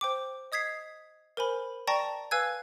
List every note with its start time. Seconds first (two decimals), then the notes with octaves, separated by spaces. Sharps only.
0.01 C5 G5 D6
0.52 D#5 D#6 G#6 B6 C7
1.37 A#4 C5 G#5 B5
1.87 D5 G5 A5 A#5 C#6 A#6
2.31 B4 F5 G#5 E6 F#6 G#6